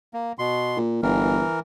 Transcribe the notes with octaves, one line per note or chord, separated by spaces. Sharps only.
A#3
B2 C6
A#2
G1 E3 A#4